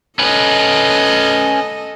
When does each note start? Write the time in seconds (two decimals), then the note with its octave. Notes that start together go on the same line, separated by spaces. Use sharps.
0.19 C#4 A4 B4 D#5